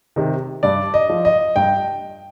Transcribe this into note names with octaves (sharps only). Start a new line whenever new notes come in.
C3 D#3
G2 D5
D#5
F3
D#5
G2 G5